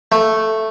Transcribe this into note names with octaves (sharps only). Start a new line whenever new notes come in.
A3